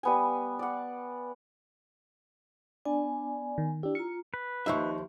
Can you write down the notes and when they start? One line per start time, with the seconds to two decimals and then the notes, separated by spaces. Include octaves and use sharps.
0.03 G3 B3 G#5
0.59 D5 F#5
2.85 B3 D4 D5 G#5
3.58 D#3
3.83 D4 E4 G4
3.95 F4 A#5 C#7
4.34 B4
4.66 D#2 F3 D#4 E5 C#6